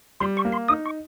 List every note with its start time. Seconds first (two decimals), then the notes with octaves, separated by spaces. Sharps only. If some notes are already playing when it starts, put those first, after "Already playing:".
0.20 G3 C6
0.37 C#6
0.45 A#3
0.52 C6
0.68 D#4 D#6
0.86 C#6